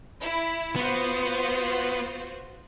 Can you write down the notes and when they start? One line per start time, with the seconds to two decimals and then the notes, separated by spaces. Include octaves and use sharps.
0.20 E4
0.76 B3 F4 F#4 C5